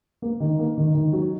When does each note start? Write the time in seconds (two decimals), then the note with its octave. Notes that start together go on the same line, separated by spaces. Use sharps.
0.22 A#3
0.40 D#3
0.59 A#3
0.78 D#3
0.95 D#3
1.13 F#3